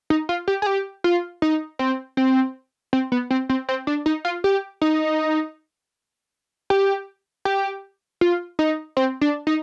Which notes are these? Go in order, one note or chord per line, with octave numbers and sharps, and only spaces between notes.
D#4
F4
G4
G#4
G4
F4
D#4
C4
C4
C4
B3
C4
C4
C4
D4
D#4
F4
G4
D#4
G4
G4
F4
D#4
C4
D4
D#4